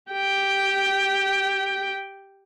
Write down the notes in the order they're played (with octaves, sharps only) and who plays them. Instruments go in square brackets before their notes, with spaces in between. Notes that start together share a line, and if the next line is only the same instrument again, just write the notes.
[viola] G4 G5